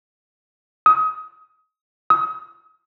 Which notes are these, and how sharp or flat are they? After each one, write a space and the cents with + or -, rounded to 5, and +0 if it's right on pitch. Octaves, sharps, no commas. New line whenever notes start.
D#6 +25
D#6 +40